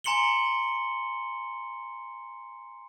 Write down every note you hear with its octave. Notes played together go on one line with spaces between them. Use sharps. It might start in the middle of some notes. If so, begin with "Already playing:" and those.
G#5 A#5 C6 C#7 F#7 G7